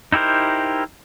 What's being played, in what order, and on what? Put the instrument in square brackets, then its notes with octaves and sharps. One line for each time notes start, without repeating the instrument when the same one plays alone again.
[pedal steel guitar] D#4 E4 G4 A#4 C5